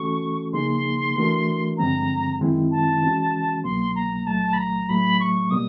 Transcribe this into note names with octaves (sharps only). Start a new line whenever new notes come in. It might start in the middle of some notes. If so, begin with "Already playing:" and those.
Already playing: E3 A3 C#4 F#4 A4 C#6
C#3 F3 A#3 D#4 G#4 C6
E3 A3 D4 F#4 A#4
G2 D3 F3 G#3 C4 A#5
F#2 D#3 G#3 C4 E4
A5
E3 G#3 C#4 F#4
C2 B2 F#3 A#3 C6
A#5
C2 A#2 F#3 A3 A5
B5
A#5
A2 F#3 A3 B5
C#6
B2 G3 A#3 D#6